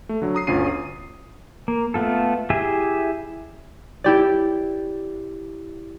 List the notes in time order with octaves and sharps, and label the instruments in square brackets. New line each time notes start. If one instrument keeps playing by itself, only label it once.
[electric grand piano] A3
D3 F#3
A#5 D#6 C7
G1 D2 C#4 F4 C7 D#7
D#7
[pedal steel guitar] A#3
A3 B3 F4 A4
E4 G4 G#4 E5 G#5
[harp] E4 G4 D5